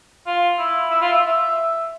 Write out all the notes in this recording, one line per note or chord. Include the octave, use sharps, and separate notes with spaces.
F4
E4
E4
F4
E5
E5